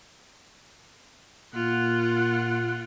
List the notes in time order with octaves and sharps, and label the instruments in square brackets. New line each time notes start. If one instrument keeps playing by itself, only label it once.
[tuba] A#2 [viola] F4 F#5